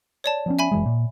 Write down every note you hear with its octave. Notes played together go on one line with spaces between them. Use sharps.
C#5 D5 A5
F3 B3 C#4
E5 G#5 B5
F#1 E3 G#3
A#2